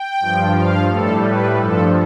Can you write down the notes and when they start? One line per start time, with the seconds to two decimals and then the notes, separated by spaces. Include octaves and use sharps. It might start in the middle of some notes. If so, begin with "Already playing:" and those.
Already playing: G5
0.20 G2 F3
0.54 F5
0.88 A2 G3 A4
1.22 B4
1.57 G2 F3 A4